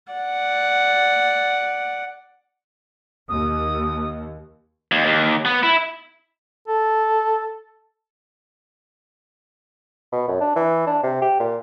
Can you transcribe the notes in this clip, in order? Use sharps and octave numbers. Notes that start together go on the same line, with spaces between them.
D5 F#5
D#2 D#6
D#2
D#2
B3
E4
A4
B2
F#2
D4
E3
D4
C3
G4
A#2